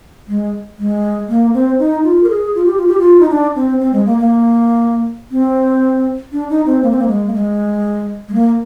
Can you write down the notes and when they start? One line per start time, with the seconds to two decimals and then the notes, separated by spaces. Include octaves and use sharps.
0.28 G#3
0.78 G#3
1.29 A#3
1.54 C4
1.79 D#4
2.03 F4
2.23 A#4
2.30 G#4
2.55 F4
2.66 G4
2.77 F4
2.88 G4
2.99 F4
3.20 D#4
3.30 D4
3.55 C4
3.80 C4
3.93 G#3
4.06 A#3
4.18 A#3
5.31 C4
6.32 D4
6.50 D#4
6.66 C4
6.83 A#3
6.91 C4
6.99 A#3
7.08 G#3
7.27 A#3
7.34 G#3
8.29 G#3
8.34 A#3